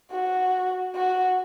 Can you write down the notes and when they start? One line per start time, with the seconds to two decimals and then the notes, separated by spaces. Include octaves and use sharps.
0.12 F#4
0.95 F#4